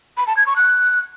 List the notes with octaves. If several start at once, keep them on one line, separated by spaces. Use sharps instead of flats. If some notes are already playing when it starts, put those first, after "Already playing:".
B5
A5
G#6
C#6
F#6